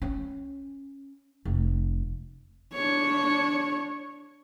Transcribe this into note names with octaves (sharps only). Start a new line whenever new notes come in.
C#4
F1
D4 C#5